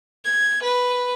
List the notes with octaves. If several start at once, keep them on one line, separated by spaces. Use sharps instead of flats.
G#6
B4